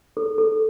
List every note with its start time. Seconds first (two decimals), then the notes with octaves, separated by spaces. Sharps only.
0.17 A4
0.38 A4